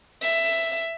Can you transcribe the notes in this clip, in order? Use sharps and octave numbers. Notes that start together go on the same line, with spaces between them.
E5